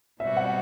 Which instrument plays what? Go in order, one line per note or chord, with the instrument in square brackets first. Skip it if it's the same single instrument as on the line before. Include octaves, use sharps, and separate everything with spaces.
[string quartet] B2 G3 C4 F#4 [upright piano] E5
[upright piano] F#5